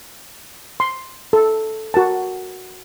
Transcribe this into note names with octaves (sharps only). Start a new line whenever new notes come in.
C6
A4
F#4 A#4 A5